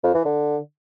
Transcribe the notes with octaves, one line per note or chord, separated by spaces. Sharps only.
F2
E3
D3